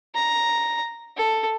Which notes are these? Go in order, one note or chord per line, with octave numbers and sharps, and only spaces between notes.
A#5
A4